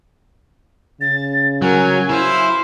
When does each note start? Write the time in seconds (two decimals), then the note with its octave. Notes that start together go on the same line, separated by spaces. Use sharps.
1.01 C#3 A6
1.62 F#3 A#4 G#5
2.09 E4 C5 F5